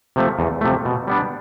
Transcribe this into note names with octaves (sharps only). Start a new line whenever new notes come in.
C3 F3 A3
E2
C3 F3 A3
B2
G3 B3 D4